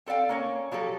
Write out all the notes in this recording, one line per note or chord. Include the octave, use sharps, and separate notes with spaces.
C4 A4 D5 F5 G5
A#3 C#4 C#5
F3 F#3 G4 A4